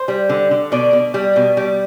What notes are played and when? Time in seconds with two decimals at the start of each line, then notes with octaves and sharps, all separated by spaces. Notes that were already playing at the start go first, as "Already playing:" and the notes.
Already playing: C5
0.08 G3
0.29 D3
0.51 D3
0.72 B2 D5
0.93 B2
1.14 G3
1.36 B2
1.57 G3